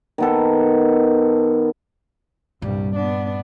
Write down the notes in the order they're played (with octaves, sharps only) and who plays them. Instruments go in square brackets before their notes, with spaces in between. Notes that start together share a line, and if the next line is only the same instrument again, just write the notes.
[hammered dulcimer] D#3 B3 A4
[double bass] C2 G3 [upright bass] G2 A#2
[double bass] B3 D4